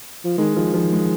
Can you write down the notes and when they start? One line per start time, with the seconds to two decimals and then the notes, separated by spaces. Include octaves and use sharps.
0.24 F3
0.38 D#3 G#3
0.56 D#3 F3
0.74 F3
0.92 G#3